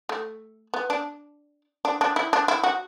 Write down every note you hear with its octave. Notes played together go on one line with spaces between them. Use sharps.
A3
B3
D4
D4
D4
E4
D4
E4
F#4